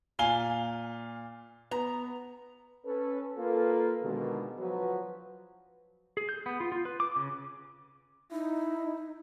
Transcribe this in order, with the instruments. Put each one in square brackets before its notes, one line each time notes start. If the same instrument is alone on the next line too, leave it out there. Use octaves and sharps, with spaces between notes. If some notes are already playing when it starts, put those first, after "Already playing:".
[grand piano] A#2 F5 G7 [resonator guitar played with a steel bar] G#5
[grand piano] B3 [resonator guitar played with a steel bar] A#5
[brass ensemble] C#4 A4 B4
A#3 F4 A4 B4
B2 D3 D#3 G#3
F3 F#3 F#4 B4
[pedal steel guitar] G#4
G6
B3
F4
F4
B4
D6
C#3
[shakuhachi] D#4 [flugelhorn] E4